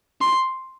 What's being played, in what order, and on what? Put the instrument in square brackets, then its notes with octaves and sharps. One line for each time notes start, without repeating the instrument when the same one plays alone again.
[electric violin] C6